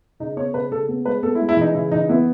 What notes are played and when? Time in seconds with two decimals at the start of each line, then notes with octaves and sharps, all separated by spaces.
0.20 C#3 D#4
0.37 B3 C#5
0.54 C#3 B4
0.71 C#3 A4
0.88 B3
1.05 G#3 B4
1.23 B3 A4
1.35 E4
1.40 G#3
1.49 E4
1.57 E3 D#4
1.74 C#3 E4
1.92 E3 D#4
2.09 B3 E4